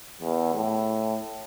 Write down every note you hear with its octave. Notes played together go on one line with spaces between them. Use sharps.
E2
A2